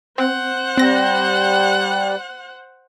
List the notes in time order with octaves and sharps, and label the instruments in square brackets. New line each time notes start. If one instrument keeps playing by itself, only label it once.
[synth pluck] C4 [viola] C5 F#5
[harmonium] G3 [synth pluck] C4 A#6